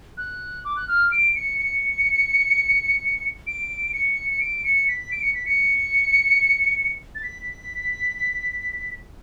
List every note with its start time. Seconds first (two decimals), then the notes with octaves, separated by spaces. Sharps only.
0.18 F#6
0.65 D6
0.76 F#6
0.88 F6
1.12 D7
1.35 C#7
1.58 C#7
3.47 D7
3.93 C#7
4.30 C#7
4.40 D7
4.64 C#7
4.88 B6
5.12 D7
5.22 C#7
5.35 B6
5.45 C#7
7.15 A6
7.23 B6